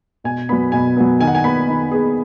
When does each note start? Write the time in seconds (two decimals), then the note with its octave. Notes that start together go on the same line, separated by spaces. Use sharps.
0.24 B2 G#5
0.49 F#3 B3 B5
0.72 B2 G#5
0.97 F#3 B3
1.21 D#3 G#5
1.27 F#5
1.35 G#5
1.44 B3 B5
1.68 D#3
1.92 B3 G#4